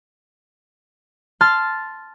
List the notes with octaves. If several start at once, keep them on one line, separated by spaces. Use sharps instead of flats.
A5 C6 F6 A6